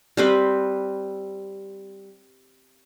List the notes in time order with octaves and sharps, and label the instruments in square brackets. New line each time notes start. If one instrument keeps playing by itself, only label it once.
[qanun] G3 C4 B4